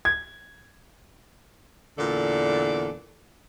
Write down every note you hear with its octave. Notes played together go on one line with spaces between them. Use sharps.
G#6
E2 A#2 D3 A4 D5